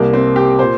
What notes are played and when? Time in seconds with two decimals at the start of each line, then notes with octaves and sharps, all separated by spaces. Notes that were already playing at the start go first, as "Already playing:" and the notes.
Already playing: C2 C3 A#3
0.13 C4
0.36 G4
0.59 A#2 C5